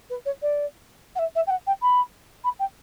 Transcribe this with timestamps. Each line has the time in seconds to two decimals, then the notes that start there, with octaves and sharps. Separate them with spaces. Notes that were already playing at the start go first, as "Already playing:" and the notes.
0.10 B4
0.25 C#5
0.42 D5
1.15 F#5
1.19 E5
1.35 E5
1.47 G5
1.50 F#5
1.66 G5
1.82 B5
2.44 B5
2.59 G5